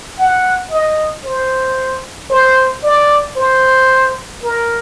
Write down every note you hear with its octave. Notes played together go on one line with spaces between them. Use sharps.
F#5
D#5
C5
C5
D5
C5
A#4